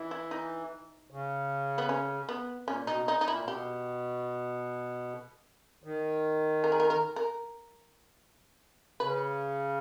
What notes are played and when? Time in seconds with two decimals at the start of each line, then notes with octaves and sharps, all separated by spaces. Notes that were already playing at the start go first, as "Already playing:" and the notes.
Already playing: E3
0.11 E4
0.31 D#4
1.11 C#3
1.78 B3
1.89 C#4
2.29 B3
2.68 A#2 C#4
2.87 B2 D#4
3.08 D#4
3.21 D#4
3.27 A#2 E4
3.47 B2 G4
5.84 D#3
6.64 A#4
6.72 G#4
6.80 A#4
6.90 A#4
7.16 A#4
9.00 C#3 B4